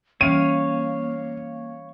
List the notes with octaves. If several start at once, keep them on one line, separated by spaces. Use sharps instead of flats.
E3 G3 A#3 C#4 C#5 F5 D#7